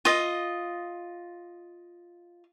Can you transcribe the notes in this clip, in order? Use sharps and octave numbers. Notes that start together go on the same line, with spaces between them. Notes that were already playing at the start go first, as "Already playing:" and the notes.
F4 D#5